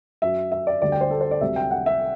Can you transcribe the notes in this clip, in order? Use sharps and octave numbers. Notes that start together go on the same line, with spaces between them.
F#2 F#3 E5
E5
D5
D2 D3 G3 D5
G5
C5
A4
C5
D5
C2 C3 F#3 E5
G5
F#5
E5